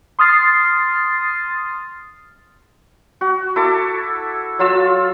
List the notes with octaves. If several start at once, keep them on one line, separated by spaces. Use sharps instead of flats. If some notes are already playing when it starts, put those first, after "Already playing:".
C6 D#6 F6 A6 C7
F#4
E4 A4 D6
F#3 F4 E6